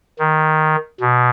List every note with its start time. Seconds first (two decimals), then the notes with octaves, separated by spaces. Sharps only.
0.19 D#3
1.01 B2